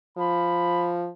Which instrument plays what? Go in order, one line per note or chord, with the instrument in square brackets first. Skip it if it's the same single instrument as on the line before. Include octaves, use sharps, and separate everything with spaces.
[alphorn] F3 [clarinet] B5